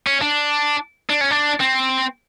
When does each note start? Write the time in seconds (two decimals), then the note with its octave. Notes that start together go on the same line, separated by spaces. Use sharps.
0.07 C#4
0.22 D4
1.10 D4
1.21 C#4
1.31 D4
1.60 C4